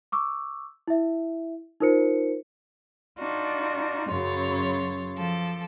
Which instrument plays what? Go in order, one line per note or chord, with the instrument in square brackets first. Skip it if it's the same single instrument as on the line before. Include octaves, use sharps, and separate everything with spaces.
[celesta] C#6 D6 E6
E4 E5
D#4 F4 A#4 C5 C#7
[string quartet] D4 D#4 F4 F#4
F#2 C#3 F#3 C#5 C6 A6
F3 A4 D6